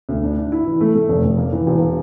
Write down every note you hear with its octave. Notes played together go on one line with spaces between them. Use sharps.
D2
D4
D4
E4
E3
A3
A3
F1
F1
A#3
E3
E1